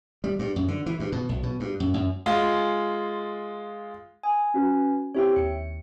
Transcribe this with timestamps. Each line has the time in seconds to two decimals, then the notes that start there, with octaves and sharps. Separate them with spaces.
0.24 G3
0.39 G2
0.56 F#2
0.68 D3
0.86 E3
1.00 G2
1.12 B2
1.29 B1
1.43 B2
1.60 G2
1.80 F#2
1.94 F#2
2.26 G#3 F4
4.23 G#5 D#6
4.54 C#4 F#4 B4
5.15 C4 E4 G4 C#5 E5 G5
5.36 D#2 C#7